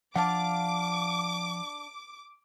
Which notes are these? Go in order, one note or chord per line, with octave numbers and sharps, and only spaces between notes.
F3 D4 F5 F#5 A5 D6